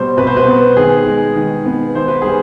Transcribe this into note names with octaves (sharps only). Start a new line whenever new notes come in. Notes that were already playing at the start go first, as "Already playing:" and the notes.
Already playing: B2 G3 C5
B2 B4
C5
B4
B3
D#3 G#4
G#3
D#3
B3
D#3 C5
B4
G3 G#4